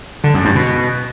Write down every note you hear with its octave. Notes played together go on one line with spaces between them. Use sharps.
D3
F#2
G2
B2